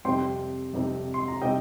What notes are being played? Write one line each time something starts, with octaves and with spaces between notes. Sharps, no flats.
F2 C3 G3 C4 D#4 G5 C6
F2 C3 G3 C4 D#4
C6
A#5
C3 G3 C4 D#4 D#5 G5